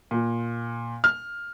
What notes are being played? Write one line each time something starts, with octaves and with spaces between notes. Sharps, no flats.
A#2
F6